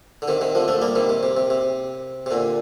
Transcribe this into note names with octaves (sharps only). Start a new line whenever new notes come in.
D3
C3 D#3
C3 D#3
D3 F3
F3 A3
G3 A#3
C3 D#3
C3
C3
C3
C3
C3
A#2 D3